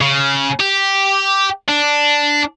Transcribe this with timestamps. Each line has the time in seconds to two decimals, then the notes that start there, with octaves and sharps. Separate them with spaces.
0.01 C#3
0.60 G4
1.69 D4